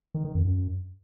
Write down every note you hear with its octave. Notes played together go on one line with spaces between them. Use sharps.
D#3
D#3
F2
F#2